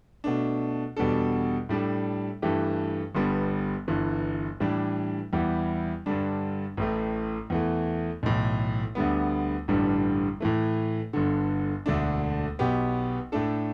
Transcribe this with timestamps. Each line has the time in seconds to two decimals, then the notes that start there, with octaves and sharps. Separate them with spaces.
0.24 B2 A3 D4
0.97 E2 B2 G3 D4 A4
1.69 A2 G3 D4 A4
2.42 G2 E3 A3 G4
3.15 G1 G2 G3 B3
3.88 G1 G2 E3
4.60 A2 E3 G3 D4
5.33 E2 E3 G3 E4 G4
6.06 G2 D3 G3 D4
6.77 A1 A2 A3
7.50 E2 E3 A3
8.23 B1 A2 E3
8.95 D2 D3 G3 B3
9.68 A1 G2 D3 G3
10.40 A2 E3 A3
11.13 G1 G2 D3
11.86 E1 D2 D3 A3 D4
12.59 B1 B2 B3 G4
13.32 A2 A3 D4 A4